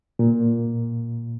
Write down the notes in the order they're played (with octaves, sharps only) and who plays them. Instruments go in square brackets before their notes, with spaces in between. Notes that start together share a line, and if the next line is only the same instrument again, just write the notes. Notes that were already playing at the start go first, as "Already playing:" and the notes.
[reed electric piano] A#2